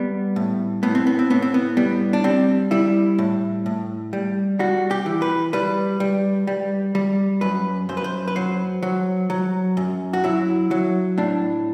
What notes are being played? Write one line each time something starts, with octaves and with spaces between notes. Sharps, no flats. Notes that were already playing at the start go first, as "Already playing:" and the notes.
Already playing: G3 B3
A2
A2 B3
C4
B3
C4
A2 B3
C4
B3
G3 B3
D4
G3 C4
G3 E4
A2
A2
G3
G3 F#4
G4
E3
B4
G3 B4
G3
G3
G3
F#2 B4
F#2 C5
B4
C5
B4
F#3 C5
F#3
F#3
F#2
F#4
F#3 E4
F#3
A2 D4